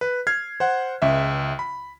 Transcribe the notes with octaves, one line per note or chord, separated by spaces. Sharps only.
B4
F6 G#6 C7
C5 F#5
C#2 E5
B5